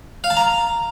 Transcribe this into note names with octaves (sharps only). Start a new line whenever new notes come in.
F5
A5
A#5